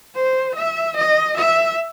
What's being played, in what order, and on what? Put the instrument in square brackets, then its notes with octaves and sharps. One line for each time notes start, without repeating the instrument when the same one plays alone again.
[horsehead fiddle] C5
E5
D#5
E5